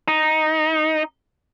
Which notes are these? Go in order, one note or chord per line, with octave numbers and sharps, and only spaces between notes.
D#4